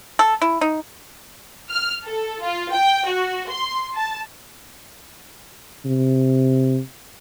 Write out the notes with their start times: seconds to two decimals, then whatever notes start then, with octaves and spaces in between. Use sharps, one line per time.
0.19 A4
0.42 E4
0.61 D#4
1.69 F6
2.04 A4
2.43 F4
2.73 G5
3.06 F#4
3.50 C6
3.95 A5
5.85 C3